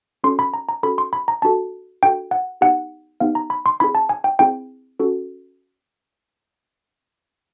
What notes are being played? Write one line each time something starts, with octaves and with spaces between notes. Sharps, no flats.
C#4 F#4 A4 C6
B5
A#5
A#5
C#4 F#4 A4 B5
C6
B5
A#5
D4 F#4 A4 A5
D4 F#4 A4 G5
F#5
B3 D#4 G4 F#5
B3 D#4 G4 F5
A#5
B5
C6
C4 E4 G#4 B5
A5
G#5
G5
C4 E4 G#4 G5
C#4 F#4 A4